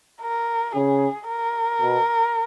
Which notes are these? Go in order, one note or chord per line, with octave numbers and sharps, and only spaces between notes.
A#4
C#3 G#4
A#4
B2